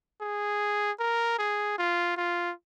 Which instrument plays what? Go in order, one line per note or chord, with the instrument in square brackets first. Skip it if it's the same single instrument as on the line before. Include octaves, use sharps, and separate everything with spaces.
[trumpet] G#4
A#4
G#4
F4
F4